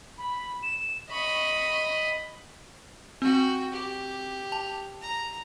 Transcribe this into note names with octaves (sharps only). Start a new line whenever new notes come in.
B5
E7
D#5 B5 C#6
C4 F#4 G5
G4
A5
A#5